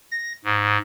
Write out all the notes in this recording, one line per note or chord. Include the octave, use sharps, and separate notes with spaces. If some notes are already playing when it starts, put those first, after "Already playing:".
A#6
G#2